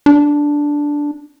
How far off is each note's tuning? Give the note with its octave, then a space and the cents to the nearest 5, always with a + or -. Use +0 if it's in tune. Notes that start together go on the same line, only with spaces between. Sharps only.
D4 -5